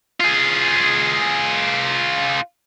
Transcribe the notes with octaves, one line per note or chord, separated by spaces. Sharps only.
F4 G#4